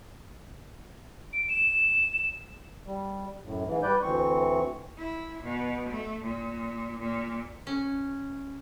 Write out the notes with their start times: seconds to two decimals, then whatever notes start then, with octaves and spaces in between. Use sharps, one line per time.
1.33 D7
1.49 E7
2.86 G3
3.44 F#2 A2
3.67 G#2 E3
3.83 G3 B4 D5 G6
4.02 D2 E3 C4 C#6
4.99 E4
5.44 B2
5.90 A3
6.25 A#2
7.01 A#2
7.67 C#4